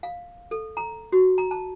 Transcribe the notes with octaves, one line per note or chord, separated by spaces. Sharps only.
F5
A4
A#5
F#4
A#5
A5